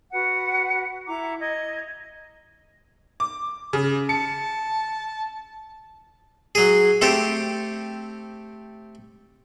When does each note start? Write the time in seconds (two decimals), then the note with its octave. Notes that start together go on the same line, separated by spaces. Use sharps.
0.12 F#4 B4 F#5
1.07 E4 A#5 D6
1.40 D#5 G#6
3.20 D6
3.73 C#3
4.09 A5 C#7
6.55 F#3 G#4
7.01 A3 C4 G4 A4